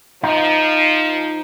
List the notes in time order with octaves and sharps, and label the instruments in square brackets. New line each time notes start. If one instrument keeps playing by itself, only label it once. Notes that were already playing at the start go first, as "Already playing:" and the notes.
[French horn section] F3 [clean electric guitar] D#4